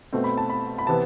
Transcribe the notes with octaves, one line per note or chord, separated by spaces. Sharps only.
B2 A3 C4
B5
A5
B5
B5
C3 E3 B3 A5